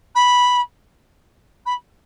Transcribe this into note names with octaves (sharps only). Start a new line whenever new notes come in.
B5
B5